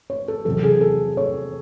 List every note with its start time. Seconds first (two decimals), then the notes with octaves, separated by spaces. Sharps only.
0.10 C#5
0.28 A4
0.45 E2 C3 F#3 A4
0.63 G#4
0.81 A4
1.17 C#5